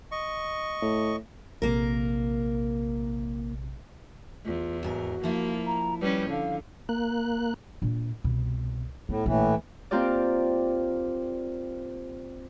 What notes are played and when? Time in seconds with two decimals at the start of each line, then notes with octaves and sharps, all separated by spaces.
0.12 D#5 C#6
0.82 A2
1.62 A#1 C3 A#3 A#4
4.46 E2 F4
4.83 D#2 G#2 F#4 A#4
5.23 F3 A#3 E4 F4
5.66 A#5
6.01 G3 C#4 B4
6.30 D3 F5
6.89 A#3 F#6
7.82 A#2 D4
8.24 C2 B2
9.09 A2 B3
9.26 A#1 A2 E3
9.91 A#3 C4 F4 G4 A#4 D5